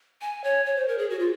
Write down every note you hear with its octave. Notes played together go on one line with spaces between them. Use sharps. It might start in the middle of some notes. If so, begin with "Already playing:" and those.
G#5
C#5
C#5
C5
A#4
G#4
F#4
F4